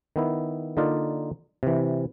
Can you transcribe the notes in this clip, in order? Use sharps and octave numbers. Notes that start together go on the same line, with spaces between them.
D#3 B3 E4
D3 A#3 D#4 F4 A#4 D5
C3 E3